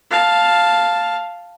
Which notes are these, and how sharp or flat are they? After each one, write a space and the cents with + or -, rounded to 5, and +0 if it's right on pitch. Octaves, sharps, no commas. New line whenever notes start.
F5 +0 A5 +0